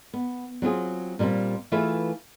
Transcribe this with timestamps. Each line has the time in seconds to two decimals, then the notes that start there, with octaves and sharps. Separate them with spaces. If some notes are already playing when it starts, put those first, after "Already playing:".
0.13 B3
0.62 F#3 C4 F4 G#4
1.19 A#2 G3 A3 A#3 C4
1.72 E3 A3 F4 G#4 B4 E5